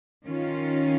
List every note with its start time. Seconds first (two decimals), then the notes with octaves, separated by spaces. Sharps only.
0.24 D#3 C#4 F4